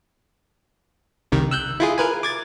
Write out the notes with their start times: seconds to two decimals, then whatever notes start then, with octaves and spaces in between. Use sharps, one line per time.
1.32 C2 C3 D#3
1.51 E6 F#6 G6
1.80 E4 F4 G#4
1.98 A#4 B4 G#5
2.23 D6 G#6 A6